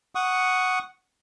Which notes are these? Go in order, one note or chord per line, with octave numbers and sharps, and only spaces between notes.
F#5 C#6 D#6